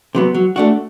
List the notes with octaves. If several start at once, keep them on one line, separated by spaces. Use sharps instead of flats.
C3 F#3 B3
F#3
A3 D4 F#4